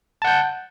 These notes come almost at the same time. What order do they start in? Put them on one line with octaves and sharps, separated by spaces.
A5 F#5 G6